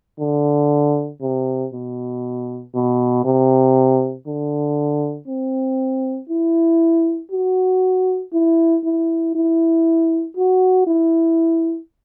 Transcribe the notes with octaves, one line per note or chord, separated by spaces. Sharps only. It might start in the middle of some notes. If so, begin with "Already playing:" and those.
D3
C3
B2
B2
C3
D3
C4
E4
F#4
E4
E4
E4
F#4
E4